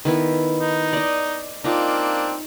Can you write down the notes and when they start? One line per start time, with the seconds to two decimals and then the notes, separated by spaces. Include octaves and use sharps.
0.05 D#3 B3 E4
0.60 D#4
0.93 D5 D#5
1.64 A#3 C4 D4 D#4 F4